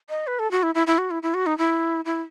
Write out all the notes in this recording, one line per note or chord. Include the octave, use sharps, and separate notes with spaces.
D#5
B4
A4
F#4
E4
E4
E4
F#4
E4
E4
F#4
D#4
E4
E4